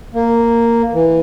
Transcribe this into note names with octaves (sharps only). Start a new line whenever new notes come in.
A#3
E3